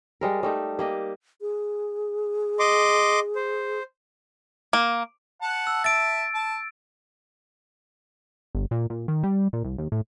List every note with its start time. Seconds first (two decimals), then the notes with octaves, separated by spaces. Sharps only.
0.21 G3 G#3 A#4
0.43 G3 A3 D#4
0.79 A#3 G4 D#5
1.41 G#4
2.59 D#5 C6 D6
3.36 C5
4.73 A#3
5.42 F#5 A5
5.67 E6
5.84 E5 A5 A6 D7
6.34 A5
8.55 G1
8.71 A#2
8.90 A#2
9.08 D#3
9.23 G3
9.53 A#2
9.64 C2
9.78 D#2
9.92 A2